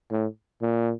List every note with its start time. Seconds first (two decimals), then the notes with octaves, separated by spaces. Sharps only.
0.11 A2
0.62 A#2